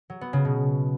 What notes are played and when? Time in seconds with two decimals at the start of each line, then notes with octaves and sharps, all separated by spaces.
0.10 F#3
0.21 B3
0.33 C#3
0.45 B2